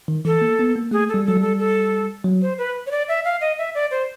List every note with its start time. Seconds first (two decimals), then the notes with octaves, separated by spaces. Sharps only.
0.08 D#3
0.25 E3 A4
0.41 A#3
0.59 B3
0.76 A#3
0.91 A3 G#4
1.09 A4
1.14 G3
1.25 F#3 A4
1.37 G3 A4
1.59 A4
2.24 F#3
2.42 C5
2.58 B4
2.87 C#5
2.91 D5
3.08 E5
3.25 F5
3.41 D#5
3.58 E5
3.75 D5
3.91 C5